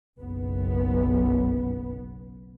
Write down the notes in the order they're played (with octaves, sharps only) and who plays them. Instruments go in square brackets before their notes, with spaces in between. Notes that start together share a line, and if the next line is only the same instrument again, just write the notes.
[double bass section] F#1 B1 B3